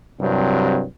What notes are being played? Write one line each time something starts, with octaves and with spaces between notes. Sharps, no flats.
C2 G2 C3 F#3